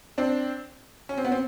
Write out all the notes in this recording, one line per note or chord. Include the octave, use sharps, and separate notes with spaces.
C4 D4
C#4
C4
B3
C4